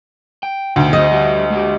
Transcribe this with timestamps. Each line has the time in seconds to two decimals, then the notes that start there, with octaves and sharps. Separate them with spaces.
0.43 G5
0.76 D2 B2 D#4 G5
0.93 F#4 G#4 C5 D#5
1.11 G3 F#4 E5
1.50 G#3 F#4 G4